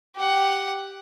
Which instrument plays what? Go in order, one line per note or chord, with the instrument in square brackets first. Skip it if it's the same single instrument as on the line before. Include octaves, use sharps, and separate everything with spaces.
[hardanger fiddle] G4 F#5